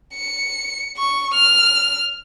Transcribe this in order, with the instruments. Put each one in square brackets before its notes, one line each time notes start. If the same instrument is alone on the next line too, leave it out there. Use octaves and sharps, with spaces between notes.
[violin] C#7
C#6
F6